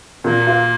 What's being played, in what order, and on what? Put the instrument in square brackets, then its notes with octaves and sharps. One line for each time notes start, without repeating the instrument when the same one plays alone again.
[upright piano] A#2 [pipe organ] A#3
[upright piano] F4